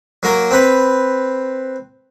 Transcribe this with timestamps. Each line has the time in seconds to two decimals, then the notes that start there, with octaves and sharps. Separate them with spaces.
0.23 F#3 A#3 A#4
0.51 C4 B4